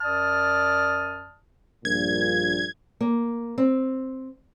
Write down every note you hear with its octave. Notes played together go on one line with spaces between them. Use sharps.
F#2 D5 A5 D#6 F6
A#1 G2 A#2 G#6
A#3
C4